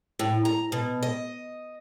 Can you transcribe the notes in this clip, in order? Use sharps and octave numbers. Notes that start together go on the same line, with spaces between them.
A2
A#5
B2
D#5